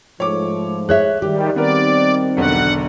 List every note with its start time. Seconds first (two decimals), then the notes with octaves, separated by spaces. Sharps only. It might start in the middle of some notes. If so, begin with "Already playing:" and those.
0.20 G#2 F3 A3 C#5 D6
0.89 G#4 C#5 E5 F#6
1.22 D#3 G3 G4
1.56 D#3 G3 B3 C4 A#4 D5
2.37 E1 B1 D3 F#5